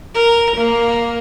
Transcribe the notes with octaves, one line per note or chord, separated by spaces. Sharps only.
A#4
A#3